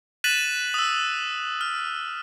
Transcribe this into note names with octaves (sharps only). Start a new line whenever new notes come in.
F#6 A6 B6 D#7 E7 F#7
D#6 E6
F6